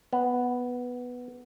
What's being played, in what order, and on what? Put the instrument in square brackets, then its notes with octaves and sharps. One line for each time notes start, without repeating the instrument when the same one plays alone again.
[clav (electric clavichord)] B3